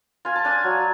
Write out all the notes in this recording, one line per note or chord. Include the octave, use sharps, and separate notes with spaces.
F4 G#5
A5
D4 G#5
F#3